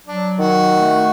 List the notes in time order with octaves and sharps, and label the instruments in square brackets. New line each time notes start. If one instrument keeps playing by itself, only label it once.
[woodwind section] F#3 [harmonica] D4
[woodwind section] D#3 [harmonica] F#4
[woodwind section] A3